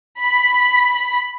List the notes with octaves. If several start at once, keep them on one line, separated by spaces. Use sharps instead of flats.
B5